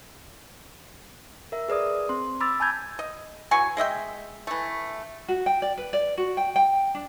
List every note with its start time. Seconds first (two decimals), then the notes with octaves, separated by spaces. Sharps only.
1.52 A#4 E5
1.69 G#4 B4 D5 D#6
2.09 C4 C6
2.41 B5 D6 E6 A6
2.60 G#5 A5 B5 G6 G#6
2.99 D#5
3.51 E3 F#3 G#5 C#6
3.77 G#3 D#5 E5 G5
4.47 E3 A3
5.28 F#4
5.46 G5
5.62 D5
5.78 B4
5.93 D5
6.17 F#4
6.37 G5
6.56 G5
6.95 D4